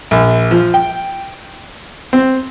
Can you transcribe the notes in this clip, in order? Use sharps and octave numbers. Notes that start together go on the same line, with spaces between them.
A#1
F3
G5
C4